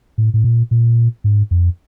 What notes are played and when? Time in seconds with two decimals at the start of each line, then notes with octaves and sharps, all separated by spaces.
0.18 A2
0.34 A2
0.44 A#2
0.71 A#2
1.24 G#2
1.51 F2